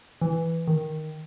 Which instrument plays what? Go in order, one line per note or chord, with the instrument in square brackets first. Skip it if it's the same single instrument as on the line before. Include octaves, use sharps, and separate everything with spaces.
[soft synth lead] E3
D#3